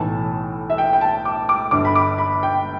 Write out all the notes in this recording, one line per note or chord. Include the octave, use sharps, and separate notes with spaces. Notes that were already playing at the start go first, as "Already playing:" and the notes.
Already playing: B1 A2 E3 A5
E5
G5
G5
A5
D6
D6
G1 G2 D3 D6
B5
D6
B5
G5